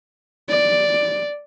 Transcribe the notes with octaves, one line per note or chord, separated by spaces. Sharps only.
D5